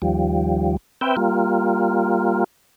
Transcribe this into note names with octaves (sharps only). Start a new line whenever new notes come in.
D#2 F3 G3
C4 B4 E5 G5
G3 A#3 F4